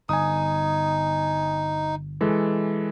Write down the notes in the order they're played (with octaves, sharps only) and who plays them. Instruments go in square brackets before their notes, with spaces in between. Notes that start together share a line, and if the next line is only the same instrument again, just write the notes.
[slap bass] G1 [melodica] D#4 [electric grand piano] G#5 D#6
[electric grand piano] E3 G#3 A4